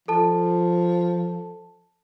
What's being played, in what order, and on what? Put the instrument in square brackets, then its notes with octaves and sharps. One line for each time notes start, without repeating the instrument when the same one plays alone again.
[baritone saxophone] F3 [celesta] A4 A5